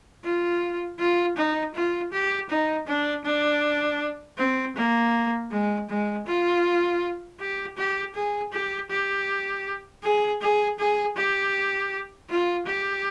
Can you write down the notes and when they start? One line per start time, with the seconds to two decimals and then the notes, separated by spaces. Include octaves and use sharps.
0.24 F4
0.99 F4
1.37 D#4
1.75 F4
2.13 G4
2.50 D#4
2.87 D4
3.25 D4
4.38 C4
4.76 A#3
5.51 G#3
5.89 G#3
6.27 F4
7.40 G4
7.78 G4
8.15 G#4
8.53 G4
8.90 G4
10.03 G#4
10.41 G#4
10.79 G#4
11.17 G4
12.30 F4
12.67 G4